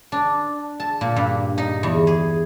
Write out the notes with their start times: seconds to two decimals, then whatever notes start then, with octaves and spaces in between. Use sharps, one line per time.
0.12 D4
0.80 A5
1.01 A#2
1.16 G2
1.58 D#4
1.83 E2
2.07 G#4